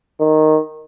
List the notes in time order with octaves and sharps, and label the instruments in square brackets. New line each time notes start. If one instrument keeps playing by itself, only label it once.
[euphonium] D#3